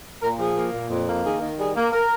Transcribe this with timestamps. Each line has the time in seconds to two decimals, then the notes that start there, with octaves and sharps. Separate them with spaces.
0.21 A#2 A#4
0.38 F3 G#4
0.56 A#3
0.73 A#2
0.90 F2
1.07 A#3
1.24 D#3 G#4
1.41 D#3
1.58 G3 G#4
1.75 A#3
1.92 A#4